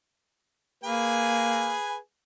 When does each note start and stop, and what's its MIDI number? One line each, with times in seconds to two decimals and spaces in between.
0.84 1.74 58
0.84 1.96 68
0.84 1.96 71
0.84 1.96 80